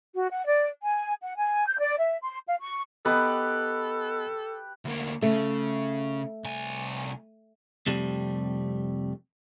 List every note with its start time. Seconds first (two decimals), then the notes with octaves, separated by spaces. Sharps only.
0.14 F#4
0.30 F#5
0.46 D5
0.83 G#5
1.22 F#5
1.36 G#5
1.67 G6
1.79 D5
1.98 E5
2.21 C6
2.47 F5
2.60 C#6
3.05 B3 D#4 G4 A4 B4
4.85 D2 A#3
5.22 C#3 A3
6.44 C2 G#5
7.87 F2 C3 G3 A3